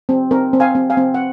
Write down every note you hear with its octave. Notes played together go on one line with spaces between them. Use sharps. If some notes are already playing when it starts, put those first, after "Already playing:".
C4
C4 A#4
C4
F5 G#5
C4
F5 G#5
C4
F#5